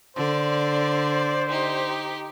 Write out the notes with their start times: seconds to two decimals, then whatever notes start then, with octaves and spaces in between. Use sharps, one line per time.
0.17 D3 C5 D5
1.48 D#4 G4